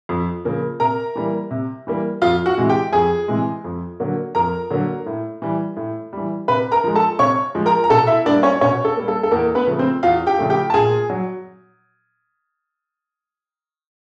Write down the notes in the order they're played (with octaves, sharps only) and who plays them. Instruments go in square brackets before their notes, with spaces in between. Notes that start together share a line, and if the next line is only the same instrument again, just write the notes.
[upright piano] F2
C#3 F3 A#3
C3 A#4 A#5
E3 G3 A#3
C3
E3 G3 A#3
F2 F4 F5
F#4 F#5
C3 E3 G#3
G4 G5
F2 G#4 G#5
C3 E3 G#3
F2
D3 F#3 A#3
F2 A#4 A#5
D3 F#3 A#3
A2
E3 G3
A2
E3 G3
C3 B4 B5
A#4 A#5
F3 G#3
A4 A5
C3 C#5 C#6
F3 G#3
A#4 A#5
A#5
B2 A4 A5
E4 E5
G3 A#3 D4 D5
C#4 C#5
B2 C#4 C#5
A4
G3 A#3
A4
A4
E2 A#3 A#4
B3 B4
C#3 F3 A3
C4 C5
E2 F4 F5
G4 G5
C#3 F3 A3
G4 G5
A5
A#2 G#4 G#5
F#3